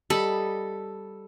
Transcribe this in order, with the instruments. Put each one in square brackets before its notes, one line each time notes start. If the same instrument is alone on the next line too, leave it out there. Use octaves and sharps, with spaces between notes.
[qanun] G3 D#5 B5 [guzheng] A4